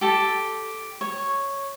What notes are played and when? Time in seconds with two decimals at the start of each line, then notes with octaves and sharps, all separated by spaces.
0.01 G4 A4
1.01 C#5